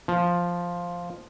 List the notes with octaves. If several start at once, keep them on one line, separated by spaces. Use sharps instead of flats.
F3